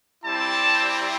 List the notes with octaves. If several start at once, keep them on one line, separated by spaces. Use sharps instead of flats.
G3 C4 E4 A5